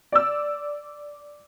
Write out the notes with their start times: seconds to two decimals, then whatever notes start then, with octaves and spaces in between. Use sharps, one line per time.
0.12 D5 E6